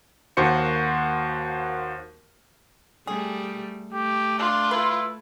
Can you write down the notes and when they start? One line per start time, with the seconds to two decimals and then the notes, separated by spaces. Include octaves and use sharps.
0.37 D#2 A#3 F#4 C5 C#7
3.07 G3 A3 G#4
3.93 A3 G4
4.39 D4 F4
4.71 E4 B4